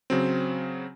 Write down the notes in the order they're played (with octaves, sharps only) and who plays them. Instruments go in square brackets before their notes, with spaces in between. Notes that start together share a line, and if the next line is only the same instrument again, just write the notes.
[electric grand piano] C#3 F#3 C4